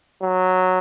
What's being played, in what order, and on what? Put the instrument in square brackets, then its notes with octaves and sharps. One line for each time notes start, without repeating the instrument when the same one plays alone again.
[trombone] F#3